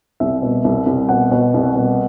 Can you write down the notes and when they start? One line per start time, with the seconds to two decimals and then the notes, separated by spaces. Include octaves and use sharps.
0.20 C2 E5
0.42 B2
0.64 C2
0.86 C2
1.09 B2 F#5
1.31 B2
1.54 C2
1.75 B2